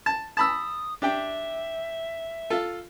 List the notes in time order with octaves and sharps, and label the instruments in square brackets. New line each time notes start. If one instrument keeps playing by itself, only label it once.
[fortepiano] A5
[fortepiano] A5 B5 E6 [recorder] D#6
[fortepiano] D4 G4 G5 [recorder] E5
[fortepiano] F4 A4